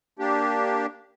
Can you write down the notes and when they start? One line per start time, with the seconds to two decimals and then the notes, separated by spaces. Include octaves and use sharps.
0.19 A#3 D4 G4